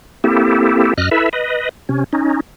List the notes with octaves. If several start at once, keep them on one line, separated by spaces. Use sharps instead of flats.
A#3 C4 E4 G4 A4
F#2 D#5 F6 F#6
E4 A4 B4 E5
B4 D#5
C3 C#4
C#4 D#4